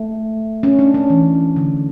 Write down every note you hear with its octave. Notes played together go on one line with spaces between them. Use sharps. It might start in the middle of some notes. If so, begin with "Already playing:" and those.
Already playing: A3
C#4
D4
C#4
E3
D3